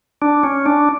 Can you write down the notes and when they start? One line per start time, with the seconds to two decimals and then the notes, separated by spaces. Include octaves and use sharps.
0.22 D4
0.43 C#4
0.66 D4